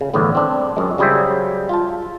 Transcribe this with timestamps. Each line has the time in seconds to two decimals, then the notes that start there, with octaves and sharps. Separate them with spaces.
0.01 C#3
0.14 G1 E2 A2 D3 B3
0.35 C4 D4
0.76 F#2 G#3
0.98 C#3 F#3 G3 G#4 C5 E5
1.69 F4 A5